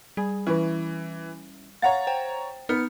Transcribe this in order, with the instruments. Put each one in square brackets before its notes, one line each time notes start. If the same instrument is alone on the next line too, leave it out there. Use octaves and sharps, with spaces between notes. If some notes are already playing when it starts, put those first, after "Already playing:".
[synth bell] G3 [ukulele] G#4
[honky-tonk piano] E3 [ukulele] C#4 E4 B4
[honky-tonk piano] C#5 A#5 A6 [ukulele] F5 F#5
[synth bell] C5 G5
[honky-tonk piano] B3 [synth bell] D#4 F6 C#7